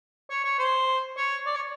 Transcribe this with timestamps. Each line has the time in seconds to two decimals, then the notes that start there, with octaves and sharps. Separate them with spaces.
0.30 C#5
0.45 C#5
0.59 C5
1.17 C#5
1.46 D5
1.55 C#5